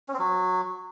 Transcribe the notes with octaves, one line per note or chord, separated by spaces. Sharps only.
C#4
C4
F#3